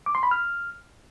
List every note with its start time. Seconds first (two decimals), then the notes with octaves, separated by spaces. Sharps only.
0.06 D6
0.15 C6
0.23 B5
0.31 F6